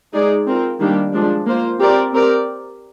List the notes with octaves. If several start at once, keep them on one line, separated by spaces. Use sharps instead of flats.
G#3 D#4 G#4 D5
C4 F4 A#4
D#3 G3 A#3 D4 G4
F3 G#3 D4
A#3 F4 C5
C4 G4 A#4 D5
C4 G4 A#4 D5